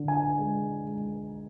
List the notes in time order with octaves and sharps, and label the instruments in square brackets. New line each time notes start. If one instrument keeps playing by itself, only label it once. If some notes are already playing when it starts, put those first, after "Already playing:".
Already playing: [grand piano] D3
G#5
G#3
G#3